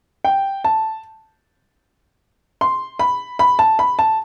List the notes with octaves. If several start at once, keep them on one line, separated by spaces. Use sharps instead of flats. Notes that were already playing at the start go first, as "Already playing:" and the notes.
G5
A5
C6
B5
B5
A5
B5
A5